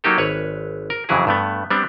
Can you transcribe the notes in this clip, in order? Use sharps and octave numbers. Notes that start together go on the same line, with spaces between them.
F#3 A#3 D#4 G4 A4
G#1 B4 C#5
A#4
F2 C#3 E3 F#3 E4 G#4
G2 A3 B3
G3 B3 C4 D4